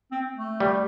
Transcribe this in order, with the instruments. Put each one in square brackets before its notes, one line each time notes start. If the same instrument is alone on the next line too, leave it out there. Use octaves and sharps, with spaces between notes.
[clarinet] C4
A3
[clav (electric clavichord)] G3